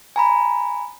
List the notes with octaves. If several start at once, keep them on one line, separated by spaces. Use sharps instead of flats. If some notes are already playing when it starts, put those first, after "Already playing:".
G#5 A#5 B5